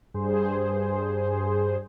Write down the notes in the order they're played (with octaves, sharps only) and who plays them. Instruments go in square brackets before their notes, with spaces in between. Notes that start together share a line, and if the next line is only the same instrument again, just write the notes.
[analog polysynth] G2 G#4 C5